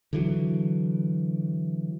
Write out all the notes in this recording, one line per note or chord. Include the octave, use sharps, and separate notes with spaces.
D3 E3 F#3